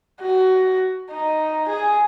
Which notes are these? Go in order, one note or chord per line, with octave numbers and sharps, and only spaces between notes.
F#4
D#4
G#4